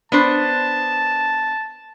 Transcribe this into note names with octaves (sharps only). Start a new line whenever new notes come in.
B3 D4 C5 A5